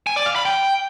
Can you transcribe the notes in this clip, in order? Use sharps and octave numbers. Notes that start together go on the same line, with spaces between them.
G#5
D5
F5
B5
G5